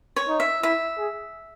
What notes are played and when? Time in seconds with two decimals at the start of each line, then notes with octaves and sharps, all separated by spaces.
0.16 C#5
0.28 D#4
0.40 E5
0.63 E4 E5
0.98 G#4